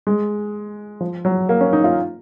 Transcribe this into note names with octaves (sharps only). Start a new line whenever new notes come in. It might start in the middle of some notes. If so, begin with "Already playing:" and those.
G#3
F3
F#3
A#3
C#4
D#4
F4